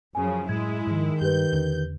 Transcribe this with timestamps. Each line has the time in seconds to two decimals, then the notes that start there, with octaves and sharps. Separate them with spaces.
0.15 F#2 C#3 F3 G#5
0.49 A2 G#3 E4 G#6
0.87 G#2 D#3 F3
1.21 G2 G4 B4 G6
1.53 E2 D3 C#4